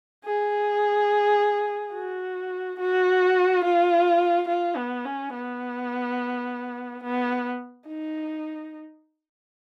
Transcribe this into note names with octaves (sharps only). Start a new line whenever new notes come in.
G#4
F#4
F#4
F4
F4
B3
C#4
B3
B3
D#4